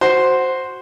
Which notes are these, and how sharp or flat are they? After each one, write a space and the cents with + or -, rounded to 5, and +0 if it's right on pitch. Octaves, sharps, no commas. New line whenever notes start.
F#4 +0 C5 +0